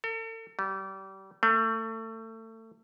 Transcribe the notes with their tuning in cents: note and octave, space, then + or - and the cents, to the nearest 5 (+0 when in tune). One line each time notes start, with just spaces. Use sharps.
A4 +40
G3 -30
A3 +30